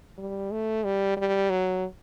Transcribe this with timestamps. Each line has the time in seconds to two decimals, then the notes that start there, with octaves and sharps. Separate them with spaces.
0.18 G3
0.51 A3
0.84 G3
1.17 G3
1.50 F#3